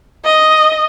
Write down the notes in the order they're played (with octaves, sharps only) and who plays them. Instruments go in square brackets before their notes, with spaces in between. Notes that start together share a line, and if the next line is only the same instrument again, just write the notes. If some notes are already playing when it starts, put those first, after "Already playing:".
[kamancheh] D#5